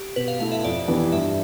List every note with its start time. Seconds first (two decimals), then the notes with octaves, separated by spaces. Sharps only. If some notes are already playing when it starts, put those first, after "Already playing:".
Already playing: G4
0.16 B2 B4
0.28 F5
0.40 A3 E4 A4 F5
0.52 E5
0.64 F2 D5
0.88 E3 B3 E4 G4
1.12 G2 E5